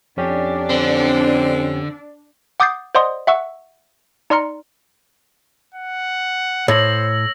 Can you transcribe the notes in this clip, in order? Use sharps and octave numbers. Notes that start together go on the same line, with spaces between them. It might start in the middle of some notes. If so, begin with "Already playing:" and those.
F2 C#4 D4 G4
D3 C4
F#5 D6 D#6 G6 A6 C7
C5 D5 D#5 F#5 C6 D#6
E5 F#5 C#6 E6
D#4 D5 A#5 C6 F6 C#7
F#5
A2 C5 C#5 E6 A#6 F#7